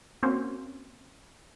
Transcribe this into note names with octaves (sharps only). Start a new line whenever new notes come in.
A#3 C4 C#4 F#4 C5